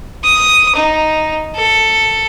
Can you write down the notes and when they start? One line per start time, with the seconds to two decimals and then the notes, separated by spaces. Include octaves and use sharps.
0.24 D#6
0.76 D#4
1.56 A4